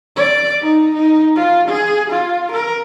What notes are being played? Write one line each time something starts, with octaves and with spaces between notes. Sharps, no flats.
D5
D#4
D#4
F4
G#4
F4
A#4